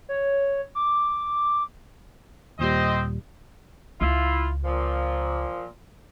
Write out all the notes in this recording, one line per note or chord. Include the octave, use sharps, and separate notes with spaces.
C#5
D6
D#2 A#2 G3 C4 C5 D#5
C#2 E4 F4
A#2 F3